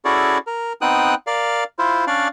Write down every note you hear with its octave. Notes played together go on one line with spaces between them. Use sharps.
C#4 E4 F#4 G#4 A4 D5
A#4
B3 C4 D#4 G5 D#6 F#6
A#4 D5 F5
E4 F4 C5
C#4 D4 D5 F5